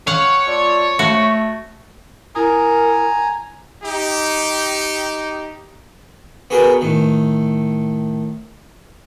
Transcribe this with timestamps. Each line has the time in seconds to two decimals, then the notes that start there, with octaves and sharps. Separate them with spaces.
0.07 C#5 F5 F#5
0.47 A3 F4 D5
0.99 A3 F#4
2.35 E4 A#4 G#5 A#5 D#6
3.84 D#4 G4
6.50 B3 F#4 G#4 A#4 B4 G5
6.81 A2 D#3